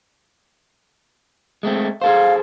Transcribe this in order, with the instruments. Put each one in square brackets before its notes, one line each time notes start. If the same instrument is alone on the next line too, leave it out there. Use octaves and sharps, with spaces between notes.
[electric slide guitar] G#3 A3 C4
[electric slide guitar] G#4 A4 C5 [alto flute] F5